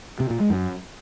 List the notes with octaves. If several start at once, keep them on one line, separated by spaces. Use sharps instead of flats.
C3
A#2
G#3
F#2